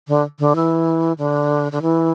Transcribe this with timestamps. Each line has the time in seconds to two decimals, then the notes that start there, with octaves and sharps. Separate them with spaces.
0.08 D3
0.39 D3
0.56 E3
1.18 D3
1.72 D3
1.82 E3